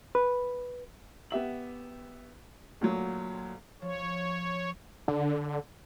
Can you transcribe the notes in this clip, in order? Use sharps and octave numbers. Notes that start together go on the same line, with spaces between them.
B4
B3 G4 E5 F#7
D2 A#2 F#3
F3 C#5
D3